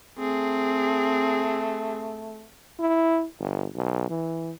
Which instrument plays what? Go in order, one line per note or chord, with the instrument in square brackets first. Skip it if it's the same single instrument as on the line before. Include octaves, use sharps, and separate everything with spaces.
[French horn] A3 [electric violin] C4 G#4
[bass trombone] E4
G1
B1
E3